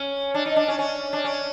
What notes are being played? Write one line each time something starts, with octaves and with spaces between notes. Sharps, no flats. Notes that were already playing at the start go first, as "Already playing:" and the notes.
Already playing: C#4
D4
D#4
D4
C#4
C#4
D4
C#4